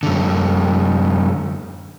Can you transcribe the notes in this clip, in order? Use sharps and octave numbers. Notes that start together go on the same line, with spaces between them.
F#2 D3